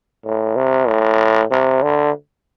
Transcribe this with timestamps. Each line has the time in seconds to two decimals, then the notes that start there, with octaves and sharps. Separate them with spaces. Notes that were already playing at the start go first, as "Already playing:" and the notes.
0.25 A2
0.56 C3
0.88 A2
1.51 C3
1.82 D3